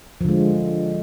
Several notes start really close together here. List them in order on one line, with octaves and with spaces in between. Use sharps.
F3 D3 G#3